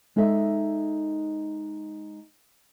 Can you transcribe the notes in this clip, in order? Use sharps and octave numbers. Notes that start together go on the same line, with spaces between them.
G#3 D#4 A4 D#5 E5